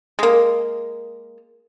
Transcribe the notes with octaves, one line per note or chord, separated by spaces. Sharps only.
G#3 A#3